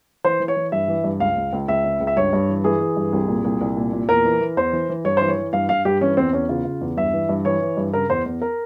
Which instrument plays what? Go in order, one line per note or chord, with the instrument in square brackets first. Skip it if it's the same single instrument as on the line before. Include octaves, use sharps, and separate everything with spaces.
[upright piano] E3 C5
E3
C#5
E3
G2 E5
E3
G2
C#2 F5
C#2
C#2
C#2 E5
C#3
C#2
E5
G2 C#5
G2
E3
E3 G#4
E3
G2
C2
A#2
C2
C2
A#2
A#2
E2 A#4
E3
E3
E2 C5
E3
E3
G2 C#5
E3 C5
C#5
E3
G2 F5
G2 F5
G2 G4
E3 C#4
E2 C4
E2 C#4
C#3 F4
C#3
E2
G2 E5
E3
G2
E3 C#5
E3
G2
C#3 A#4
E2 C5
E2
A#4